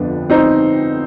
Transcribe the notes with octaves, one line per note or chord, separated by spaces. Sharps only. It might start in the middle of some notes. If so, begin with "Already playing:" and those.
Already playing: G1 F2 D3 F3 B3 D4
C4 D#4